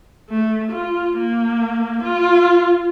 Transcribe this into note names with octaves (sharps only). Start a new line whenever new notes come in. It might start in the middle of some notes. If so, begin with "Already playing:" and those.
A3
F4
A#3
F4